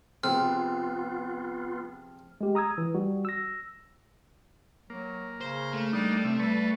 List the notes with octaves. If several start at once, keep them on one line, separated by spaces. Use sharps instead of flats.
C3 F3 B3 F4 G#4 F6
G#3 G4
A#5 D#6 E6 G#6
E3
G3 F#4
E6 A#6
F#3 A#3
C#3 C5
A3
G3 A#3 D4 D#4
C3 E6
G3 B4 A5 C#6